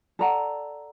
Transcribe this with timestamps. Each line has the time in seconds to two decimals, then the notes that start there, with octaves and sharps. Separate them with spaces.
0.19 A4 D5 F#5 A#5